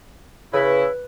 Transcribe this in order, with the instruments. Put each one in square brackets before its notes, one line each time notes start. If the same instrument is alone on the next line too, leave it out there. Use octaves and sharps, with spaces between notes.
[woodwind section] C#3 E4 [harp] B4